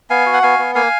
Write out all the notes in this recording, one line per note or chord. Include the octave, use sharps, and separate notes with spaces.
B3 F5 G#5
F#4
F#5
B3 F5 G#5
B3
A#3 F5 G#5